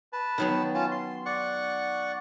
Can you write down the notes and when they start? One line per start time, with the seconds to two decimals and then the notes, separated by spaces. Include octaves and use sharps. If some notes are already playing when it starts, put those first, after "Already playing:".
0.13 B4 A5
0.38 D#3 F#3 B3
0.74 C#4 F4 A5
0.91 C6
1.26 D5 F#5 C#6